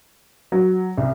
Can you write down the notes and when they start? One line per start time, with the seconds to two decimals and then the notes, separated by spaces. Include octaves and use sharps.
0.52 F#3
0.98 C2